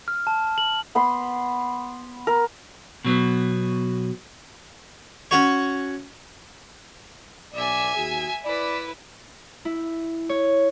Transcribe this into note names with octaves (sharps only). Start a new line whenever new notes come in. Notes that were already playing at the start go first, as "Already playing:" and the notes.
F6
A5
F#7
B3 B5 C6
A#4
B2 F#3 B3
C#4 F#4 C#5
B1 B2 D5 E5 G#5
D#2 F#4 G#4
E4 B4 D5
E4
C#5